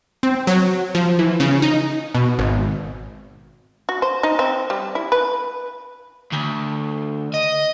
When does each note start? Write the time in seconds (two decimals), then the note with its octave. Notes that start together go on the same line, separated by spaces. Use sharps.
0.23 C4
0.47 F#3
0.95 F3
1.19 E3
1.40 C#3
1.62 D#4
2.15 B2
2.38 G#1
3.89 F#4
4.02 C5
4.23 D#4
4.39 C4
4.70 G3
4.95 E4
5.12 B4
6.32 D2
7.34 D#5